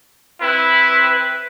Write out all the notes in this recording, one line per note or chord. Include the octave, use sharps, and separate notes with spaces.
C4 E4 B4